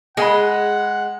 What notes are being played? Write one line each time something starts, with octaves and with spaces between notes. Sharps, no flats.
G#3 G#4 F#5 G#5 B5